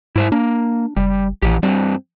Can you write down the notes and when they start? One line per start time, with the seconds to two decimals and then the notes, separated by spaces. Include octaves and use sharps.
0.16 G#2 E4 C5 E5
0.32 A#3 D4
0.96 F#1 G3
1.42 A#1 E3 G4
1.63 G2 G3 C4